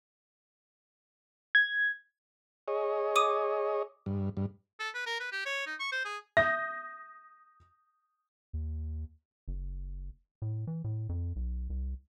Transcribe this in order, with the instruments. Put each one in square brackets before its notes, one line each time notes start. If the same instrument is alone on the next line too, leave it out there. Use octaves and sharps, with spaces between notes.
[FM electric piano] G#6
[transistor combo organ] G#4 C#5 D#5
[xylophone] D6 D#6 D#7
[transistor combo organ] G2
G2
[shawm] A4
B4
A#4
B4
G4
C#5
D#4
C#6
C5
G#4
[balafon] E5 [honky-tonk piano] D#6 G6 A#6
[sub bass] D#2
[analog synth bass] F#1
A2
E3
A2
F2
B1
C2